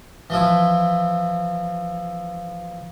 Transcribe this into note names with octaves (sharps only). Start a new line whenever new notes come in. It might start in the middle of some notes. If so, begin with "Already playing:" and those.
E3 F3 E4